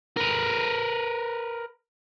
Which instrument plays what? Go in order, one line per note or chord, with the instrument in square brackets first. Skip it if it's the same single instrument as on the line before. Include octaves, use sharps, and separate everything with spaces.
[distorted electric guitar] A#4 B4